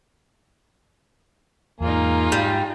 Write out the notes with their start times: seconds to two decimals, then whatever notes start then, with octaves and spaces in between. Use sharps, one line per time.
1.80 E2 G#2 A#3 D#4 F4 G#4
2.32 G#2 G3